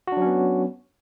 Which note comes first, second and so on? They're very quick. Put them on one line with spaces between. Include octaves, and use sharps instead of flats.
F#4 D4 F#3 C#4 B3